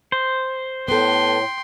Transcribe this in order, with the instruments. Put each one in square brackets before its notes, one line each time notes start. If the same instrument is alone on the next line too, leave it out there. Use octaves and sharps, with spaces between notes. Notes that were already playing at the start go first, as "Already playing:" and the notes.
[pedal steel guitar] C5
[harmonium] A2 [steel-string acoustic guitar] B3 A4 [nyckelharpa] G5 C6